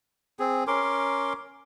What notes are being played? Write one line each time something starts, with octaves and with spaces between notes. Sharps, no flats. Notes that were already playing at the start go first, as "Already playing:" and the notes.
C4 G#4
C#4 A#4 C6 D6